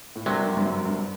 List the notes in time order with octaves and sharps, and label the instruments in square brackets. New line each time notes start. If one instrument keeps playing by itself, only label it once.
[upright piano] A2
[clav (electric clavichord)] C2 C3 F#3 [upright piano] G2
[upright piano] F#2
G2
F#2
G2